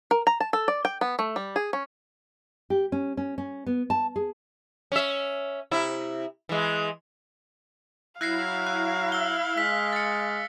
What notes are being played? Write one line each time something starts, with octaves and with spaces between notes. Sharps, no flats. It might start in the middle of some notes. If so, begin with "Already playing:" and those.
A#4
A#5
A5
A4
D5
G5
B3
A3
G3
G#4
C#4
G4
C#4
C#4
C#4
B3
A5
G#4
C#4 E5
C3 E4
E3 G#3
F#3 E4 F5 F#6 A#6 C7
F#6
E6 G7
G#3 B6
A6 C#7